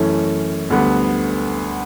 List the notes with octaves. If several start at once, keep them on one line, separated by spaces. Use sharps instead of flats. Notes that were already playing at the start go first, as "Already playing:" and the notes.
Already playing: F#2 E3 A3 C#4
D2 D3 G3 B3